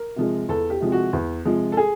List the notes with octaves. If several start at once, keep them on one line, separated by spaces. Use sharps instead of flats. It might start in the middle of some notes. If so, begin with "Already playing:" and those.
Already playing: A#4
C3 F3 G#3
E2 A4
G4
C3 F3 G#3
F#4
E2
C3 F3 G#3
A4
G#4